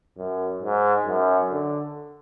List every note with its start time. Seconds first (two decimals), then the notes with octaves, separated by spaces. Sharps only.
0.18 F#2
0.62 G#2
1.06 F#2
1.51 D3